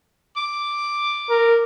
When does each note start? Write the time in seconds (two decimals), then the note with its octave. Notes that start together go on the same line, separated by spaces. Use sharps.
0.36 D6
1.30 A#4